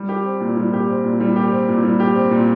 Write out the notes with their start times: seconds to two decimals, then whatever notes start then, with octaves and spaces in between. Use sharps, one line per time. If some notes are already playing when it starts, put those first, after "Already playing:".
Already playing: G3
0.09 G4
0.25 C4
0.40 A#2
0.57 G3
0.73 G4
0.89 C4
1.05 A#2
1.20 G3
1.36 G4
1.52 C4
1.69 A#2
1.83 G3
2.00 G4
2.15 C4
2.31 A#2